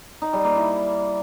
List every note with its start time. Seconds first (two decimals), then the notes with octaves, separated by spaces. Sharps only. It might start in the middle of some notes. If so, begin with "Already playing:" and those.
0.22 D#4
0.33 G3
0.44 A#3
0.56 E4